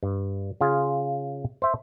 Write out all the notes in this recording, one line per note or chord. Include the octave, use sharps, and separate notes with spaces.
G2
C#3 F4 G#4
C5 E5